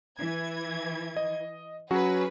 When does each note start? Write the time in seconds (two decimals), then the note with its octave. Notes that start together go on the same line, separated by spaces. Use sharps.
0.19 E3 G#6
1.16 D#5
1.91 F#3 C#4 F#4 G#4 B4